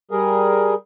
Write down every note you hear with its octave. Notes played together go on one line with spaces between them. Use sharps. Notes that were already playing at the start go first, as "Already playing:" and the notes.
G3 G#4 A#4